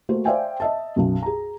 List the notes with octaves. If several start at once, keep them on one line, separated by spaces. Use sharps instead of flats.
A3 A#3 F#4 C5
C5 D5 E5 F5 G5 G#5
D#5 E5 A5
B1 F#2
G#4 A#5